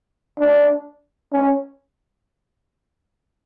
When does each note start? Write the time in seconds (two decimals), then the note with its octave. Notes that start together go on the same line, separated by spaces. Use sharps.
0.39 D4
1.33 C#4